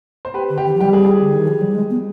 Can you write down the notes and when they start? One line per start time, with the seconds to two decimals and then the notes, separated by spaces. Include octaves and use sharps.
0.25 C5
0.34 G4 B4
0.50 D3
0.58 G4
0.66 D#3
0.74 F3
0.80 G3 G4
0.93 G#4
1.05 G#4
1.21 D3
1.34 D#3
1.48 F3
1.61 G3
1.75 G#3
1.90 B3